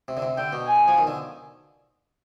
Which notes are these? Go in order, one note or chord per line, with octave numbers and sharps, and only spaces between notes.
C3
D3
C3
D3 G5
B2
G#5
F3
D#3
D3